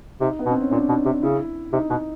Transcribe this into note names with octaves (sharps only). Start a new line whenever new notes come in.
C3 D#4
B3
B2
C4
C#4
A#2 D4
B2 D#4
C3
C#3 E4
C3 D#4
B2